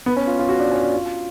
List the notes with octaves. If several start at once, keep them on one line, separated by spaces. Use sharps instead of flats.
B3
C#4
F4
F4
F#4
D4
C#4
D4
F4